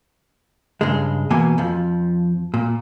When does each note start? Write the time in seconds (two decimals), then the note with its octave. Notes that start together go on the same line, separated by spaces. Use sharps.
0.81 G2 C#3 G#3
1.30 B2 E3 A#3 G#5
1.58 F2 F3
2.54 A#2